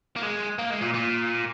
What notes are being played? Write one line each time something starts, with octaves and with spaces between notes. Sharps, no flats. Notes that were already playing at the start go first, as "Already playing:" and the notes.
A#3
G#3
A#3
G#3
A#2
A#2